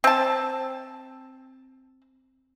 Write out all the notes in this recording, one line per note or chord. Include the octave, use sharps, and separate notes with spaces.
C4 A5